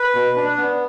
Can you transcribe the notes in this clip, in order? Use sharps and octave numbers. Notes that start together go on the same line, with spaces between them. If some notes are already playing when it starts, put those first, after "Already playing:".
Already playing: B4
B2
D4
B3